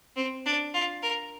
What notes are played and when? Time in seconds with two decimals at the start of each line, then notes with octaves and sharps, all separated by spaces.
0.16 C4
0.46 D4
0.74 F4
1.02 A#4